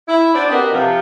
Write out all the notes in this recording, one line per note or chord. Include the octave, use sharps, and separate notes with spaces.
E4
D4 F#4 C5 D5
C4 F#4 G4 A#4 B4 D#5
C3 F3